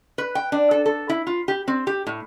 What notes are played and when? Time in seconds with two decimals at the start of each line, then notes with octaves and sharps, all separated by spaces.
0.18 B4
0.35 G5
0.52 D4
0.71 A4
0.86 A4
1.09 E4
1.27 F4
1.48 G4
1.68 C4
1.87 G4
2.07 A2